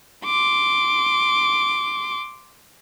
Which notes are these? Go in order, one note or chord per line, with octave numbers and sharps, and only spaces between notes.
C6 D6